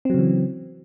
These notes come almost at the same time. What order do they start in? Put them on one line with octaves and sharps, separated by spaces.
C4 F#3 C#3 E3